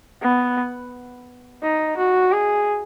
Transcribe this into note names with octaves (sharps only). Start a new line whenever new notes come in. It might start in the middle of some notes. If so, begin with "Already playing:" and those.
B3
D#4
F#4
G#4